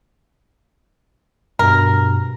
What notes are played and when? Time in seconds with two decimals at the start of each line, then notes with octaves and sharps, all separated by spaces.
1.59 G2 B2 A#4